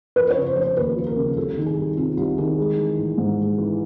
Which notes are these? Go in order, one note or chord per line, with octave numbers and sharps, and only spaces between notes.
F3 B4
C#5
C#3
C5
F1 C#5
C5
D#2 B4
F3
A#4
C#3
C2 A4
D#3
G#4
C2
C3 F4
C2
D#3 G#4
G#3
E3
A1
G#2
G#3
E3